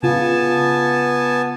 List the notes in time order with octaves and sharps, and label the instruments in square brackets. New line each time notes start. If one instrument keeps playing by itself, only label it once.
[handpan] C#3 F4 [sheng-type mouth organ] B3 G#5 A5